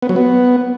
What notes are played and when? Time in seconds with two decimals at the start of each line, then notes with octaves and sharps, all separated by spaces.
0.02 B3
0.09 F#3
0.16 B3